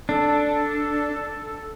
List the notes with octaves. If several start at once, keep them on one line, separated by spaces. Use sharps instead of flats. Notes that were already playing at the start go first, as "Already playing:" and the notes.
D4 A4